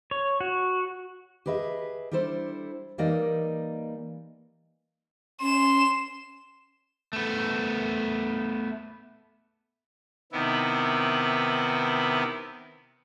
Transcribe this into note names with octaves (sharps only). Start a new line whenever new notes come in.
C#5
F#4
G4 G#4 B4 D#5 E5
G3 D4 E4 A4 C5
E3 G3 A#3 D#4 D5 D#5
C#4 C6 E7
A3 B3
C3 D#3 B3 E4